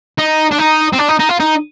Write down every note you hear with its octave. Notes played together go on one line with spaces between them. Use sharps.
D#4
D4
D#4
C4
D4
D#4
D#4
F4
D#4